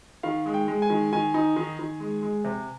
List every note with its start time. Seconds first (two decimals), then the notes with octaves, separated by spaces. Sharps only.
0.23 D#3 F5
0.46 G#3
0.54 G5
0.68 G#3
0.82 G#5
0.90 D#3
1.13 D#3 G#5
1.34 D#4
1.56 D#3
1.79 D#3
2.00 G#3
2.22 G#3
2.44 C3